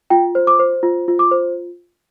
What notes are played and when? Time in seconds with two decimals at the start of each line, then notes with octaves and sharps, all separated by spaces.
0.10 F4 G5
0.35 C5
0.47 D6
0.59 C5
0.83 F4
1.08 F4
1.19 D6
1.31 C5